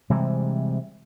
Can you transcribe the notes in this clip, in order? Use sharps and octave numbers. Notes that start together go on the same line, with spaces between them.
C3 E3 G3 G#3